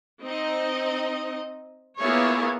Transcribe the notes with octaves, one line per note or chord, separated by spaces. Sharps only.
C4 D#4 D#5
A#3 B3 E4 F4 G#4 C#5